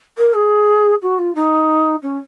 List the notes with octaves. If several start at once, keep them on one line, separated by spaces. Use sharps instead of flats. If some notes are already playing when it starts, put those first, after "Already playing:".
A#4
G#4
F#4
F4
D#4
C#4